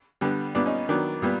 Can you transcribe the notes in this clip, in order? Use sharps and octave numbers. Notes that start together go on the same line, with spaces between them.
D3 G3 B3
A#2 G3 B3 D4
C#4 D#4
D#3 F#3 B3 D4
A#2 G3 B3